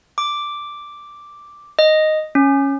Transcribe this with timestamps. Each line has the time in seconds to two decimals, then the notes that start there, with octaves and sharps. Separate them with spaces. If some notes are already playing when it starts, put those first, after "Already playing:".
0.18 D6
1.79 D#5
2.35 C#4